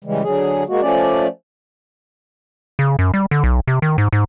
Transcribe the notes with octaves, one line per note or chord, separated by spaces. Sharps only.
C#3 E3 G3 G#3
D3 F#3 G#4
G#3 A#3 F#4
F3 A3 C#4 D5
C#3
F#2
G3
D3
B1
C3
D#3
G#2
G#2